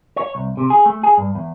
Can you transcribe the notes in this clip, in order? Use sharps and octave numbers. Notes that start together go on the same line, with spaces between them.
C#5
C2
C3
G#4
A3
G#4
G2
E2